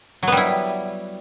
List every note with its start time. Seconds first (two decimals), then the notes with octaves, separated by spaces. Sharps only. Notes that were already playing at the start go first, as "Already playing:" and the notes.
0.23 F#3
0.27 B3
0.32 G3
0.37 E4